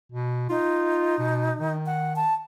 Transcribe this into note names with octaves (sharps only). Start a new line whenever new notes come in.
B2
D#4 F4
B2
D#3
F#5
A5